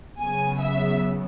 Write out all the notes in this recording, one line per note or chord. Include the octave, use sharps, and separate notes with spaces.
C#3 F#3 B3 G#5
E5